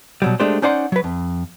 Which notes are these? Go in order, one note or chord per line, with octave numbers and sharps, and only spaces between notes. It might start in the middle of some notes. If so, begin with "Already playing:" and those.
B2 F#3 G3
G#3 A3 D4 G4 C5
C#4 D#4 C5 D5 F#5 C6
F#3 B4
F2